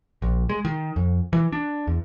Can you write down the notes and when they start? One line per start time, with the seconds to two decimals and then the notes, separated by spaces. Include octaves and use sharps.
0.22 A#1
0.49 G#3
0.65 D#3
0.96 F2
1.33 E3
1.52 D4
1.87 E2